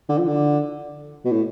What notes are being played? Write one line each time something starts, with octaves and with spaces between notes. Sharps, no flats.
D3
F3
D3
B2
A2